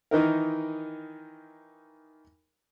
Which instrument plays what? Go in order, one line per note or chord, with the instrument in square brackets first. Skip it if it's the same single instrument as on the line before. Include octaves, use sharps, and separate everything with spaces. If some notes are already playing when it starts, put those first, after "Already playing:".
[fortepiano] D#3 E3 D#4 A#4